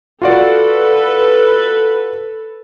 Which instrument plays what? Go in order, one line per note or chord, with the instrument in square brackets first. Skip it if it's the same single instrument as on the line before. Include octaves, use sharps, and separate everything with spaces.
[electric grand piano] F4 F#4 D5 [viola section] A4 B4